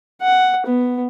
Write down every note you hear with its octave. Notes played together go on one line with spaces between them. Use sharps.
F#5
B3